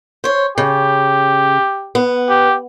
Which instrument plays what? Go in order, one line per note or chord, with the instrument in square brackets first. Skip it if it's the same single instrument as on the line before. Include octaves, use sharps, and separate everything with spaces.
[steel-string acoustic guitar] C5 C#5
[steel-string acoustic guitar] C#3 [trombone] G4
[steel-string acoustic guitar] B3
[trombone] G4